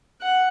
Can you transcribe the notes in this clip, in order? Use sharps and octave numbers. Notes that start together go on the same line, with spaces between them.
F#5